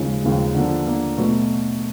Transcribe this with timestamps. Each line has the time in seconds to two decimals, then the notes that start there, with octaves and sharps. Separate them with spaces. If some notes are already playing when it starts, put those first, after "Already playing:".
Already playing: D#2 C#3 F3 G#3
0.22 D#2 C#3 F3 G#3
0.55 D3 F3 A#3
0.87 D3 F3 A#3
1.17 B2 F#3 A3